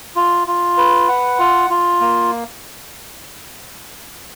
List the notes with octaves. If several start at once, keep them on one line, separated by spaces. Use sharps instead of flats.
F4
F4
B4
F#5
F4
F4
A#3